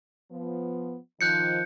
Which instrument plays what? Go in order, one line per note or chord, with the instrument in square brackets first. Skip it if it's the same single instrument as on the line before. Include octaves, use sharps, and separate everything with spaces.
[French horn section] F3 B3
[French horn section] D#3 F3 [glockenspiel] F#6 G6 C#7